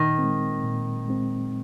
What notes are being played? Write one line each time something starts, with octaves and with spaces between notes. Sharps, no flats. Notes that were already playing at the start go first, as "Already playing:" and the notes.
Already playing: A#2 D#3
G#3 C4
A#2
G#3 C4